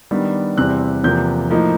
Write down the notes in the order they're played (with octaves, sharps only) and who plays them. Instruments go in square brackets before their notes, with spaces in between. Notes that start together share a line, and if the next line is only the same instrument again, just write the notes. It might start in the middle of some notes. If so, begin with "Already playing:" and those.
[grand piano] D#3 G3 B3 D4
E2 C3 E3 G3 C4 F#6
E2 C3 F3 A#3 G6
A2 F3 A#3 D#4